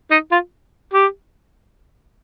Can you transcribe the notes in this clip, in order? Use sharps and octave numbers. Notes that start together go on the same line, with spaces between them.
D#4
F4
G4